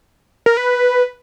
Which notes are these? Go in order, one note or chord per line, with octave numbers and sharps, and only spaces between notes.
A#4
B4